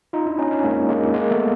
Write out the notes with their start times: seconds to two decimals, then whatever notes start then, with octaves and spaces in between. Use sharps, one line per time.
0.13 D#4 F4
0.26 D4 E4
0.38 C#4 D#4
0.51 C#4 D#4
0.64 G#3 A#3
0.89 G#3 A#3
1.14 G#3 A#3
1.31 A3 B3